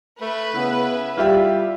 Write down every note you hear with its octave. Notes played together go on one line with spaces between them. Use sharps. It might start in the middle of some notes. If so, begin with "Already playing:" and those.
A3 B4
C#3 B3 E4
G3 F4 G4 E5